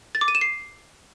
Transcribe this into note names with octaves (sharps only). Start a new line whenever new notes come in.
A6
D6
D#7
E7
C7